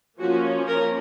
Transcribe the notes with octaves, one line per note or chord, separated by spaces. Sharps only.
F3 A#3 C#4 F#4
A#4